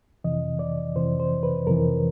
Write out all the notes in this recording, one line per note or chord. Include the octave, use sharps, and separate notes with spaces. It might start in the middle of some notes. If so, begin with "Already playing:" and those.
F2 C3 E3 D#5
D5
F2 C3 E3 C5
C5
B4
F2 C3 E3 A#4